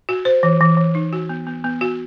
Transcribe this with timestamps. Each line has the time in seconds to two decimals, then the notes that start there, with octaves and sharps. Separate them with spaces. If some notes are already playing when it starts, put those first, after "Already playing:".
0.09 F#4
0.25 C5
0.43 E3
0.61 E3
0.77 E3
0.95 D#4
1.13 F#4
1.29 B3
1.47 B3
1.64 B3
1.81 F#4